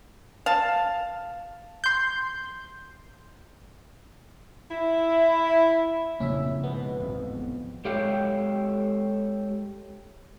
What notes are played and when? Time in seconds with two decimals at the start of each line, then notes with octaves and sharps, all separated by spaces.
0.46 F5 A5
1.84 C6 G6
4.71 E4
6.20 F1 A#1 F2 C#3 A#3 C#4 E4 E5
6.64 G#2 B2 B3
7.00 D1 G#1 F2
7.85 G#3 G4 A4 C#5 F5 G5